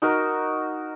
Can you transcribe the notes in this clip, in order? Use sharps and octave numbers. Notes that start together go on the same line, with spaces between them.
D#4 F#4 A#4